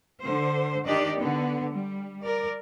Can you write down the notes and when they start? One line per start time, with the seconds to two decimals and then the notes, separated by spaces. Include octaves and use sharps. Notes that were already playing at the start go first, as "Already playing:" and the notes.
0.23 D3 C5
0.86 D#3 D4 G4 D5 D#5
1.17 D3 B3
1.74 G3
2.24 A#4 D5